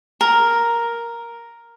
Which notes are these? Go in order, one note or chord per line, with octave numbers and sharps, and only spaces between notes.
A#4